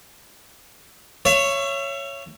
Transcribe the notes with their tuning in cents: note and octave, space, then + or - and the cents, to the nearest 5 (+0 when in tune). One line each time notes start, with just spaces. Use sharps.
C#5 +0 E5 +35